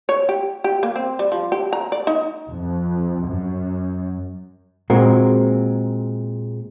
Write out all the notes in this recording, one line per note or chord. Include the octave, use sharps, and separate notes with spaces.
C#5
G4
G4
A#3
C4
G3
F3
G4
A#5
D5
D#4
F2
F#2
A#2 G#3 C4 F#4 A#4